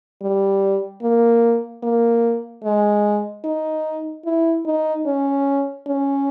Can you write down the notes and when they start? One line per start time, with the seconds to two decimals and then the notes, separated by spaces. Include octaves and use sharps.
0.22 G3
1.02 A#3
1.83 A#3
2.64 G#3
3.44 D#4
4.25 E4
4.66 D#4
5.06 C#4
5.87 C#4